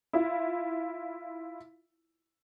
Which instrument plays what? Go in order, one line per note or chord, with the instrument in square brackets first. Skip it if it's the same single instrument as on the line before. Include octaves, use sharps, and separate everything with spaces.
[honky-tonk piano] E4 F4